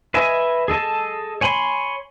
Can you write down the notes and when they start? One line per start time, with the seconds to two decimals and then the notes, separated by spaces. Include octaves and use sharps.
0.14 B4 D#5 E5 G#5
0.68 G#4 A4 D#5 A5
1.41 C#5 G#5 B5 C6